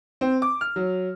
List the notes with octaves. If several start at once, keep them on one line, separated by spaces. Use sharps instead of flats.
C4
D6
F6
F#3